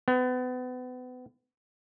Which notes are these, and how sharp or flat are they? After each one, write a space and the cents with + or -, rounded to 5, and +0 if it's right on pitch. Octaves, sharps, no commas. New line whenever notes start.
B3 +35